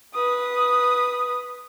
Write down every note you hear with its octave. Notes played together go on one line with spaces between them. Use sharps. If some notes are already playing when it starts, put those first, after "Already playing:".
B4 D#6